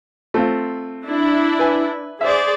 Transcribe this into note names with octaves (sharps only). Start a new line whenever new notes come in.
A3 C4 F4
D4 E4
B4 G#5
G#4 C5 D5 E5